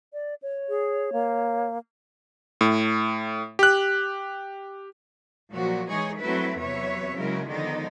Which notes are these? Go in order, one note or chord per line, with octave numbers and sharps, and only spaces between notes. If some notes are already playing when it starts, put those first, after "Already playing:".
D5
C#5
G#4
A#3
A2
G4 F#6
A#2 F3 F#3 F#4
E3 G#3 D#4 G#4 C#5
F#3 A3 C4 E4 B4 E5
E2 C3 F#3 B4 C#5 E5
C#3 F#3 G#3 E4 A#4
D3 D#3 F3 G#3 B3 D#4